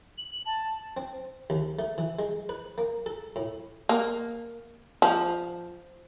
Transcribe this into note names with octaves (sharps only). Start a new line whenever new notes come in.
F#7
A5
C4
D#2
A3
E3
G#3
B4
A#3
A4
A2
A#3
F3